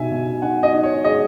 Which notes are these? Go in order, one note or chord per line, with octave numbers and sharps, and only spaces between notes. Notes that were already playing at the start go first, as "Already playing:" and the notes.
Already playing: B2 D#4 E5 G#5
B2
D#4 F#5
D#5
D#4
C#5
G#3 D#5